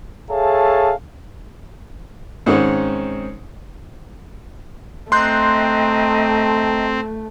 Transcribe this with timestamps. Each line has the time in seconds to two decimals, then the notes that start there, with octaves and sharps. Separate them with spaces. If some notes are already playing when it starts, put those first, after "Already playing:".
0.30 G#4 A4 C#5 E5 F5 A5
2.46 G#2 D#3 C4 C#4
5.12 A3 C4 D#5 G5 A#5 C6 F#6 G6